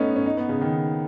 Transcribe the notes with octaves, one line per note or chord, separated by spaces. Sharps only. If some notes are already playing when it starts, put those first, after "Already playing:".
Already playing: A3 B3 C#4 D#4
C#4
D#4
B3
C#3
D#3